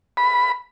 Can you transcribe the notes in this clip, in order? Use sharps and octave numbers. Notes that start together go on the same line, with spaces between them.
B5